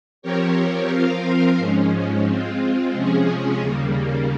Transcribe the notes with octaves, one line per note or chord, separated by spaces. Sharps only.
F3 C4 G4 A#4 C#5
F3 C4 F4 A#4 F5
G#2 F3 G#3 C#4
G#3 C4 F4
C3 F3 G#3 C#4 G#4
D#2 C#3 G3 A#3